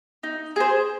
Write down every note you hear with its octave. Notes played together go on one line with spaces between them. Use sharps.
D#4
G#4 C5